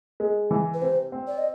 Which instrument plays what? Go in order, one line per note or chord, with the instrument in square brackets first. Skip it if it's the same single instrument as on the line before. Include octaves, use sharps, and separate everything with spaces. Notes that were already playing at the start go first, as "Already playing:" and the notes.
[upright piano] G#3
E3
[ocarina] B4
[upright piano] C3 [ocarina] C5
[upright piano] C4
[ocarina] D5
D#5